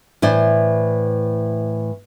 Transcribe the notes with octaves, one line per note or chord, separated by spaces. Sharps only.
A2 E3 C5 D5